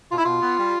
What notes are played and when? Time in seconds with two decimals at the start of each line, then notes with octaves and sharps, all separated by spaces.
0.11 B2 F4
0.18 E4
0.25 B2 F4
0.42 B3
0.58 G3